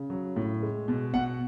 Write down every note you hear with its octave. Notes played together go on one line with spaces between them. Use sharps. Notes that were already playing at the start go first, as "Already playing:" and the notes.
Already playing: C#3
F#3
A2
G#3
B2
B2 F#5